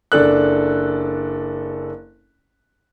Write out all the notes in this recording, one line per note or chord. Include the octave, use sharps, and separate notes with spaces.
F#1 D4 A4 F#6